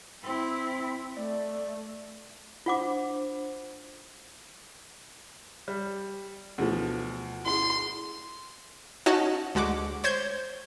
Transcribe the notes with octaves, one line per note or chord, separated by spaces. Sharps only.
C4 E4
A3 D5
D4 F4 C5 F#5 D6
G3
D2 B2 E3 F3 A3
E4 G#4 C6
C#4 D#4 F#4 D#5 A5
D2 G#3 F#4 D6
C5 C#5 G6 G#6